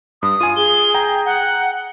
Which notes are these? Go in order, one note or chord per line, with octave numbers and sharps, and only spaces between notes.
G2 D#6
F4 G#5 D#7
G#4 G7
G5 A#5
F#5